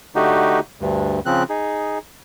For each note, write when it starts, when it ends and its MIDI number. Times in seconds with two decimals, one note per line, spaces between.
0.15 0.60 50
0.15 0.60 57
0.15 0.60 63
0.15 0.60 66
0.15 0.60 67
0.80 1.20 38
0.80 1.20 43
1.26 1.43 49
1.26 1.43 53
1.26 1.43 60
1.26 1.43 90
1.50 1.98 63
1.50 1.98 68